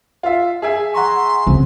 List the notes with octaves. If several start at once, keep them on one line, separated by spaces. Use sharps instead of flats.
F4 E5
G#4 E5 G#5
F#5 A#5 C6 C#6
C#3 C4